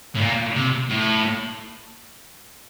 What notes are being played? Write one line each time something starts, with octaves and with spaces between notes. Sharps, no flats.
A2
A#2
C3
A2